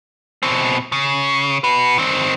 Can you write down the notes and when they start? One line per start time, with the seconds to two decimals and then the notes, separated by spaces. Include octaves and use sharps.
0.43 B2 C4
0.92 C#3
1.64 F#4 B4
1.98 D#3 C4